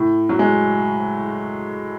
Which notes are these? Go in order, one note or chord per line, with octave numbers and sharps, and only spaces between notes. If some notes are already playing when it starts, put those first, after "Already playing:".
Already playing: A2
F#3
G#3